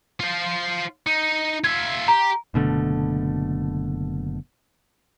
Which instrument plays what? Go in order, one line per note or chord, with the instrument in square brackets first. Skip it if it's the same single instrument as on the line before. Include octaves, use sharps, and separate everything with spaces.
[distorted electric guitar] F4 C5
D#4
[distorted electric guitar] F4 E5 [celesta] G#6
[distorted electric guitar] G4 [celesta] A#5
[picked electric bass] F#1 B2 D3 A3